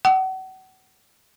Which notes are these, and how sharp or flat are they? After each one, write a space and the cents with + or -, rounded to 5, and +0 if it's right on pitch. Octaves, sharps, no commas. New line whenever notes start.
F#5 +35